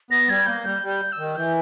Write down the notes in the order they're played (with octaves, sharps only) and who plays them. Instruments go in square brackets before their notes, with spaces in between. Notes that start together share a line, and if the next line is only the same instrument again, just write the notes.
[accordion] B3 [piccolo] A#6
[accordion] G3 [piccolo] G#6
[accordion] A#3 [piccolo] G6
[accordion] G3 [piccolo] G6
[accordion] G3
[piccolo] G6
E6
[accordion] D#3
[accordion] E3 [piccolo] G6